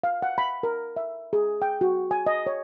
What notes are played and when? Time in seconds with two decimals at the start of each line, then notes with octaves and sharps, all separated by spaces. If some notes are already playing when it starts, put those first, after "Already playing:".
0.04 F5
0.22 F#5
0.38 B5
0.63 A#4
0.96 E5
1.33 G#4
1.62 G5
1.81 F#4
2.11 G#5
2.27 D#5
2.46 C#5